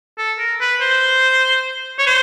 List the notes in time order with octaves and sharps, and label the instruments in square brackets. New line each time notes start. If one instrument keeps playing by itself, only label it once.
[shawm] A4
A#4
B4
C5
C#5
C5